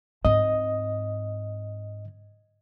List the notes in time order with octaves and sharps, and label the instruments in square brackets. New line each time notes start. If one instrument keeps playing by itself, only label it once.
[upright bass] G#2 C4 [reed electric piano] D#5